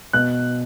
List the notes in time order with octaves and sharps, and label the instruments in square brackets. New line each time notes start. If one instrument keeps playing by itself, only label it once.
[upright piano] B2 F#6